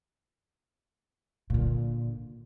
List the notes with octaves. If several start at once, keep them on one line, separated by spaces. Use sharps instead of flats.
A#2 D3